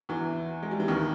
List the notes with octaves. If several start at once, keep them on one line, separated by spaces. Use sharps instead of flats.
E2 E3
G#3
G3
E3
D#2 D#3